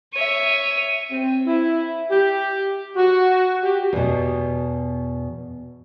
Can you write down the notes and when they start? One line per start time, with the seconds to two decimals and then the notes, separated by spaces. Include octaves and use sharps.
0.13 C#5 E5 D#7
1.11 C4
1.46 E4
2.11 G4
2.96 F#4
3.63 G4
3.93 E2 B2